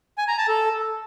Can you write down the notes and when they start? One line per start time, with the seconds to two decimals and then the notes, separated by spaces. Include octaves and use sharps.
0.18 G#5
0.28 A#5
0.38 A5
0.48 A4